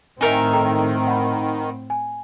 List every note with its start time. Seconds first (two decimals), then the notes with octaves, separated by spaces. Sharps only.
0.21 A2 D#3 C4 D#4 A#4 E5 G#5
0.53 A4 G5 A#5
1.07 F#5 B5
1.90 G#5